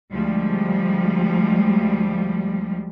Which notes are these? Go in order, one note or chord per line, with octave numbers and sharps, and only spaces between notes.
D2 F3 G3 G#3